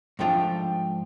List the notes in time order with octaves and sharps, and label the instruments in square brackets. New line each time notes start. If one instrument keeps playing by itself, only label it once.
[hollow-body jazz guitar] G#2 F3 A3 D4 F4 [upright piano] G5